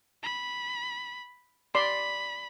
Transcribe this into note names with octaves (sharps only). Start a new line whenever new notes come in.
B5
D5 B5 C6